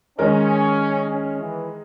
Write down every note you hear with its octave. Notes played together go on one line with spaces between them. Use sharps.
D#3 G#3 C#4 D#4 A#4
C#4
E3